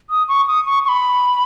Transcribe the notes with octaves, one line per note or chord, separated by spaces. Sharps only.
D#6
C#6
D#6
C#6
C#6
B5